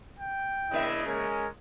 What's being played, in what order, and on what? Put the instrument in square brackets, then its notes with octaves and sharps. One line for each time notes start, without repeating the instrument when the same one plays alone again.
[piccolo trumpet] G5
[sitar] C#3 A#3 E5 [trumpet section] D4 E4 D#5
[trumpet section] G#3 C#4 [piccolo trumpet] A#4